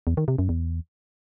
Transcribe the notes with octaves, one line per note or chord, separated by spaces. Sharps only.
E2
D#3
C3
F#2
E2